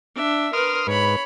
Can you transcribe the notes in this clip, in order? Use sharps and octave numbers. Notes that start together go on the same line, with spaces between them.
D4 E5
A#4 B4 C6 D#6 F6
G#2 B4 C#5 B5